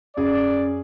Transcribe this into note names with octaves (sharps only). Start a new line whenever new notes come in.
F#2 C#4 G#4 D5